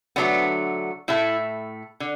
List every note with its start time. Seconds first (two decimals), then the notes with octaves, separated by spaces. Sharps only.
0.16 D3 F#3 A3 B3
1.08 A2 A3 E4
2.00 D3